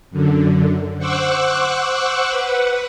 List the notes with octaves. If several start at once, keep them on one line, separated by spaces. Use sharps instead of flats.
F#2 D3
C5 F#5 C#6 D6 E6 F#6
B4 F#5